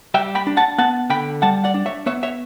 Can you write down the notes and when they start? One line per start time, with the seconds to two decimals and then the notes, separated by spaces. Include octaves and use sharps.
0.14 G3 E5 G5
0.35 G5 B5
0.47 D4
0.57 F#5 A5
0.78 B3 F#5 A5
1.10 D3 G5 B5
1.42 G3 F#5 A5
1.64 D5 F#5
1.74 D4
1.86 C#5 E5
2.06 B3 C#5 E5
2.23 C#5 E5